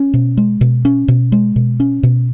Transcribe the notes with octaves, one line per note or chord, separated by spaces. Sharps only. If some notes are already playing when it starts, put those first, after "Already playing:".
Already playing: C#4
B2
G#3
B2
C#4
B2
G#3
B2
C#4
B2